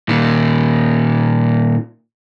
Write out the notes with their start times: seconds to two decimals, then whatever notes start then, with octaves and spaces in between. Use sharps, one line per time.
0.09 A#2 D#3